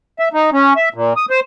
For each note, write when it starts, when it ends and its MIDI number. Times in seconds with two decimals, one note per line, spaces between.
0.19 0.29 76
0.33 0.50 63
0.53 0.73 61
0.76 0.89 76
0.94 1.13 46
1.16 1.26 87
1.30 1.40 72